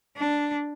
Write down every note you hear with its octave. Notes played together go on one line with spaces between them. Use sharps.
D4